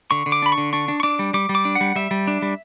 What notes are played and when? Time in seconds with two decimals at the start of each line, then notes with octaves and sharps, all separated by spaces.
0.11 D3 C#6
0.26 D3
0.32 D6
0.42 D4 B5
0.52 C#6
0.58 D3
0.73 D4 C#6
0.88 D4
1.00 C#6
1.03 D4 D6
1.19 G3
1.34 G3 D6
1.49 G3
1.55 D6
1.65 D4
1.75 F#5
1.81 G3
1.96 G3 E5
2.11 G3
2.27 D4
2.42 G3